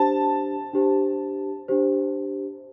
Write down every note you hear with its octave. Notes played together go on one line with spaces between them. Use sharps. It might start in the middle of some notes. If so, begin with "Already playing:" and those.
Already playing: D4 G4 C5 A5
D4 G4 C5
D4 G4 C5